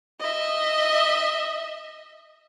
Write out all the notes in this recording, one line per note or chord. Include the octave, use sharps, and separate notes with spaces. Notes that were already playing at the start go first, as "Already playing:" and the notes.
D#5 E5